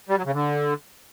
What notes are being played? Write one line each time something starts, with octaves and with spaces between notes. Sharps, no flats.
G3
F#3
C#3
D3